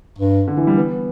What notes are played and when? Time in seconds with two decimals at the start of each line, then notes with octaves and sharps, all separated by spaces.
0.18 G2
0.47 D3
0.57 E3
0.67 G3
0.77 B3